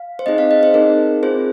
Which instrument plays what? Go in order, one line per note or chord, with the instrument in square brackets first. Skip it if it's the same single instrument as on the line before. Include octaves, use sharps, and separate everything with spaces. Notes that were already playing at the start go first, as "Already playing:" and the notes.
Already playing: [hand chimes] F5
C5
C4 D#4 G#4 D#5
F5
D#5
C5
C4 D#4 G#4 A#4
C4 F4 G#4 C5